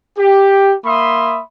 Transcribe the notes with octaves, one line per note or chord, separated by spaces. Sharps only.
G4
A#3 E5 B5 C6 D#6